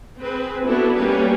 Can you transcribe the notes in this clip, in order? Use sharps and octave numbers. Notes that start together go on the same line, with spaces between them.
C4 G#4 B4
B3 D4 E4 F#4 A4
G3 A#3 C#4 G4 B4